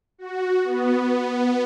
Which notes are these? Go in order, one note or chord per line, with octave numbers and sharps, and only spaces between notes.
F#4
B3